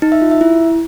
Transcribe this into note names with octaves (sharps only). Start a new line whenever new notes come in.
D#4
E5
F4
E5
E4